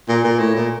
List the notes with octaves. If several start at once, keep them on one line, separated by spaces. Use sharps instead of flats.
A#2
A#2
A2
A#2